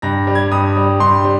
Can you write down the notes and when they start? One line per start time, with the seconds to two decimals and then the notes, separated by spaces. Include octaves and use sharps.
0.02 G2 A#6
0.27 G3
0.35 G#6
0.52 G2 D#6
0.76 G3
1.00 G2 C6
1.24 G3